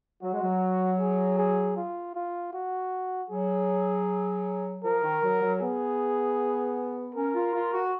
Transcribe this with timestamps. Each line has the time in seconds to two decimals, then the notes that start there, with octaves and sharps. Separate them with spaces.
0.22 F#3 F#4
0.33 G#3
0.42 F#3
0.99 G#4
1.38 G#4
1.77 F4
2.15 F4
2.53 F#4
3.30 F#3 G#4
4.84 F3 A#4
5.03 D#3
5.22 F#3
5.42 F#3
5.61 B3 G#4
7.14 C#4 A#4
7.34 F4
7.53 F4
7.72 F#4